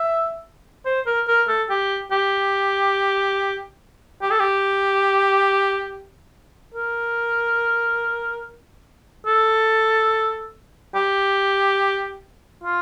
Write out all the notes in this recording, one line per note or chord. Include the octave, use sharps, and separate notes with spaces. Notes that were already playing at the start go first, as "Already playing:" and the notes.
Already playing: E5
C5
A#4
A#4
A4
G4
G4
G4
A4
G4
A#4
A4
G4
F4